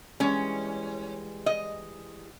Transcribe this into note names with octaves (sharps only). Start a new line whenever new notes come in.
E3 G3 G#3 C#4
D#5